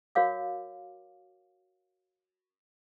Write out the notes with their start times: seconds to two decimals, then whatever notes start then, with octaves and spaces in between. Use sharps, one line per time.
0.15 F#4 A#4 C#5 F5 D6